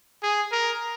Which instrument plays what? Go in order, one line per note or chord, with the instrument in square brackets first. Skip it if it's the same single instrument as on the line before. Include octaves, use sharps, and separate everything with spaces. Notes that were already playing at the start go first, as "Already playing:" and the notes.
[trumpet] G#4
A#4